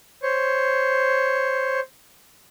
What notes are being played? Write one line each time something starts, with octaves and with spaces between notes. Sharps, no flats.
C5 C#5